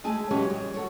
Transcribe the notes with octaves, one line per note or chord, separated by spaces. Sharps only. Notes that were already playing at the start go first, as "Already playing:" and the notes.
G#3 A3 G#4 G#5 A5
E3 F#3 G#3 C#4 G4 C#5
G3 G#3
F#4 A4 C#5